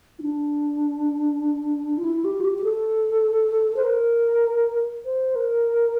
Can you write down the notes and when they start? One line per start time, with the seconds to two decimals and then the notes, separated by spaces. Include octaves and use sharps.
0.19 E4
0.22 D4
1.98 F4
2.04 E4
2.24 G4
2.41 F4
2.44 G4
2.58 G4
2.64 A4
3.76 C5
3.84 A#4
5.05 C5
5.35 A#4